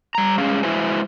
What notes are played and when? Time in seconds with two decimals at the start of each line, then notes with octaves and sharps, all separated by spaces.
0.15 G3 A#5
0.38 G2 G#3 C#4 G#4 F5
0.63 G#3 E4 F#4 B4 C5 G#5